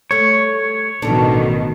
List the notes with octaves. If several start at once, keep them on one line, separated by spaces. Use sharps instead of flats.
G3 A3 C#5
A1 G2 B2 D3 D#3 D4